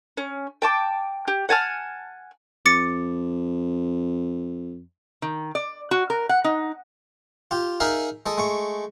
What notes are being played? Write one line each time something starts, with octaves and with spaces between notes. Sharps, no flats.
C#4
G5 A5 D6
G4
F#5 G#5 A5 F6
F2 D6 A6 C#7
D#3
D5
F#4
A#4
F#5
D#4
F4 G4
D#4 G#4 A#4 E5 F5
G#3 A4 D#5
G#3 A3 C#6